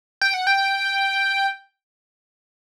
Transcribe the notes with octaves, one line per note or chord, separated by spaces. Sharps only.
G5
F#5
G5